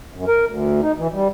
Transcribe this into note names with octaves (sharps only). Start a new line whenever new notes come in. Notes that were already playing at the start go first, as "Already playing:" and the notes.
F#2
A#4
D2
D#4
E3
G3